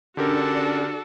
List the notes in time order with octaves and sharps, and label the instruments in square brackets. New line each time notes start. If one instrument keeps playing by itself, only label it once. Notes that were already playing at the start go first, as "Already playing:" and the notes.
[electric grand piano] D3 G4 A#4 [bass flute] C#4 [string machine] D4 [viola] F#4 A4